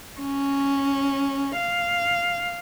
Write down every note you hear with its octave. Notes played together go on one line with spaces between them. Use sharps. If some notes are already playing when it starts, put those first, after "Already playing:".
C#4
F5